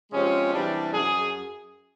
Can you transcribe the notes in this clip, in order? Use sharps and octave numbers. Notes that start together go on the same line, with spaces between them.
C3 F3 G#3 C#4
C3 E3 G3 D4
F#2 G#4